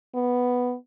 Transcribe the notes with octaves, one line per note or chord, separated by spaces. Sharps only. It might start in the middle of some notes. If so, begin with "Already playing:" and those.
B3